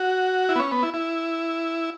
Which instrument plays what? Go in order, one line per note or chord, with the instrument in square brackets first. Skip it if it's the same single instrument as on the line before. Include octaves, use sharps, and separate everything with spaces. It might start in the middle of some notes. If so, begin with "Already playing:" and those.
Already playing: [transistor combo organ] F#4
E4
B3
C#4
B3
E4
E4